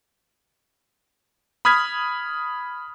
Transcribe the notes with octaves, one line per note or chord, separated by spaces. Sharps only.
B5 D#6 F6 G#6 B6